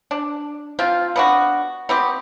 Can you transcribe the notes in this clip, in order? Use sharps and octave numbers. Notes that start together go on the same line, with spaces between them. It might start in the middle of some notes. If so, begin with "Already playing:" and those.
D4
F3 C4 F4
B3 D4 F#4
B3 C4 G4